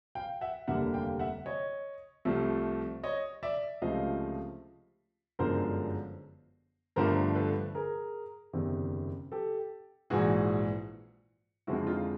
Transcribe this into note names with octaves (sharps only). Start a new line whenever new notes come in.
F5 G5
E5 F#5
F1 D#2 D3 G3 A#3 E5 F#5
F5 G5
E5 F#5
C#5 D#5
C2 C3 F3 A3
C#5 D#5
D5 E5
C#2 C3 F3 A3 D#5 F5
G1 F#2 D3 F3 G#3 A#4 C5
G1 G2 D3 F3 A3 A#4 C5
A4 B4
G#4 A#4
F#1 E2 C3 D#3
G4 A4
A#1 G#2 E3 F#4 G#4
F2 D3 F3 G#3 E4 F#4
D#4 F4